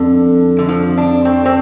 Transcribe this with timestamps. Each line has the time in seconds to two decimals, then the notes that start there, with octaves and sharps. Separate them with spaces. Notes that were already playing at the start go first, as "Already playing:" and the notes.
Already playing: F2 D3
0.59 D3
0.69 F3
0.98 D4
1.25 C4
1.46 C4